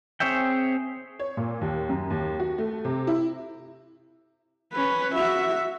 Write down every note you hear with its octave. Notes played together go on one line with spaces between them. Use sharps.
C4 G#4 C#5 E5 G5
C#5
A#2
D#2
F#2
D#2
F#4
A3
C3
E4
C#4 B4
F#4 E5